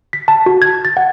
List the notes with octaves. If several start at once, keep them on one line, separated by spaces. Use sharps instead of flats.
B6
A5
F#4
G#6
A6
F#5